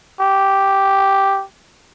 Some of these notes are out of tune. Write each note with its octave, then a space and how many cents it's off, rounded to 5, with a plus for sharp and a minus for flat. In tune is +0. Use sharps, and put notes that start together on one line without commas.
G4 -5